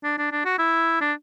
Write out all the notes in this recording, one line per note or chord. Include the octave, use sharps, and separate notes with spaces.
D4
D4
D4
F#4
E4
D4